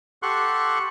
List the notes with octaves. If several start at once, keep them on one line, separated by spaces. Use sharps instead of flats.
G4 A4 F#5 C6 C#6 F#6